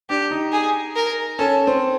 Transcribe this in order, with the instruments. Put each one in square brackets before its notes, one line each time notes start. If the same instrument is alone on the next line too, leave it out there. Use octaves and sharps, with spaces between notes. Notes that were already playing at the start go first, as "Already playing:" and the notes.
[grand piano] D4 [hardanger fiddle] G4
[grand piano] D#4
[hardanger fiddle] G#4
A#4
[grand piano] C#4 [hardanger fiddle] A4
[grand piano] C4